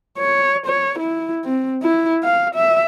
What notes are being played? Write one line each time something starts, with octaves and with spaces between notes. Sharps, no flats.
C#5
C#5
E4
C4
E4
F5
E5